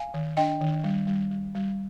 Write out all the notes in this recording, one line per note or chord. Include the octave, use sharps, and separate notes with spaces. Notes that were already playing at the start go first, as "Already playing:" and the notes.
Already playing: F5 G#5
D#3
D4 D#5 G5
D#3
G3
G3
G3
G3